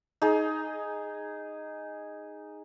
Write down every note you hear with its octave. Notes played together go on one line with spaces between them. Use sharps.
D#4 G#4